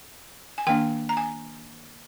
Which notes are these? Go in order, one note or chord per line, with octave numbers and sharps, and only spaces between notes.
G#5
D#3 A#3 D4 G5
A#5
G#5